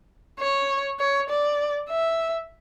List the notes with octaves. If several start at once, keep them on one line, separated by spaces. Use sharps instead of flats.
C#5
C#5
D5
E5